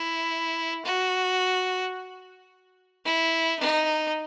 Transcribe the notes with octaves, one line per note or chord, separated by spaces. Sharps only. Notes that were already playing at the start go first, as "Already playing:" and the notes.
Already playing: E4
F#4
E4
D#4